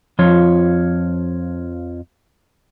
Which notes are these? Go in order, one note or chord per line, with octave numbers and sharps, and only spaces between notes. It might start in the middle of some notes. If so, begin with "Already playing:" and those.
F2 F3 F4 C#5